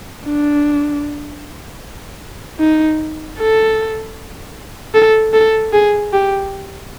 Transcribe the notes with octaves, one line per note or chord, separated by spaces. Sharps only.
D4
D#4
A4
A4
A4
G#4
G4